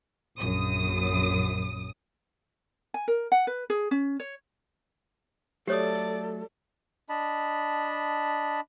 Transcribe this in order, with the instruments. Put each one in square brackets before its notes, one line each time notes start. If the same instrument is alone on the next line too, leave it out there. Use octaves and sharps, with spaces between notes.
[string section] A#1 F#2 D#6
[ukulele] G#5
A#4
F#5
B4
G#4
C#4
C#5
[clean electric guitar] F#3 A3 [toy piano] G4 C#5 D#6 [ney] A4 [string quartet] D5 A6
[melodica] D4 D#5 A5 B5